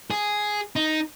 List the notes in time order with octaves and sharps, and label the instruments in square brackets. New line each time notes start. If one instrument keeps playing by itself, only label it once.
[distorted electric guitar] G#4
D#4